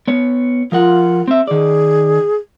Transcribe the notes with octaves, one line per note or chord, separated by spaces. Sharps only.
B3 C#5
F3 F4 A#4 F#5
C4 E5
D#3 G#4 D5